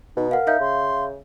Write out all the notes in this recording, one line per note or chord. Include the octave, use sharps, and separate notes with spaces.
B2 D#4
A#4 F5 F#5
D#4 E5 F5 G6
C#3 C6